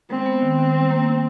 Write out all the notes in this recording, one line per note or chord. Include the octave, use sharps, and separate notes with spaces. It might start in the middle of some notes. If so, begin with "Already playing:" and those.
G#3 C4
B3
D#3
D#3
G3
A#3
C#4